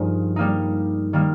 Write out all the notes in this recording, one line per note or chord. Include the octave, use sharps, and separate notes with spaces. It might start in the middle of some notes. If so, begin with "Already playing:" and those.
Already playing: G2 F3 A#3 D#4 G#4
G3 A#3 D#4
D#3 G3 A#3